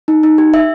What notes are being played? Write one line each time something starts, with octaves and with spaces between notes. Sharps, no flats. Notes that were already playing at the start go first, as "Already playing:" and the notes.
D#4
D#4
G4
E5